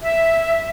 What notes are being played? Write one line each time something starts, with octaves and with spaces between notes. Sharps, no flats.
E5